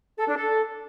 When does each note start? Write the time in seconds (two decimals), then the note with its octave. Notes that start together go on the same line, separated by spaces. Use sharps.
0.18 A4
0.28 D4
0.37 A4